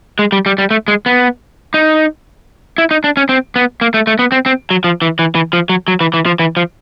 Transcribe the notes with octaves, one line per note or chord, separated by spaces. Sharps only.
G#3
G3
G3
G3
A3
G#3
B3
D#4
E4
D#4
D4
C#4
C4
B3
A#3
A3
A3
B3
C4
C4
F#3
F3
E3
E3
E3
F3
F#3
F#3
E3
E3
F3
E3
F3